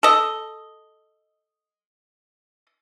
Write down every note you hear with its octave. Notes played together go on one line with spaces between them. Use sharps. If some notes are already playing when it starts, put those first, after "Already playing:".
A4 D#5